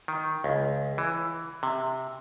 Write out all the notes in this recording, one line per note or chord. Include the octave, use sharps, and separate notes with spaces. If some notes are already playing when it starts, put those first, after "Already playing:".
D#3
C#2
E3
C3